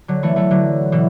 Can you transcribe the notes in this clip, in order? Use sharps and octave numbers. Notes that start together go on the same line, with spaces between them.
D3 F#3
E3 A3
E3 A3
D3 F#3
B2 E3